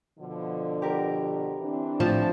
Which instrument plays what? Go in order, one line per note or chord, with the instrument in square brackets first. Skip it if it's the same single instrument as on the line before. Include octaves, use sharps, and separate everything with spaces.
[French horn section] B2 D3 F3
[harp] G4 A#4
[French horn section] E3 C4 D4
[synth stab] A2 A5 [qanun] F3